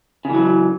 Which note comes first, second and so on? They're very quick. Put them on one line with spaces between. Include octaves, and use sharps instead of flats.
C#3 E3 F#3